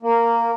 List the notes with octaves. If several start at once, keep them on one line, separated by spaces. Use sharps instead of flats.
A#3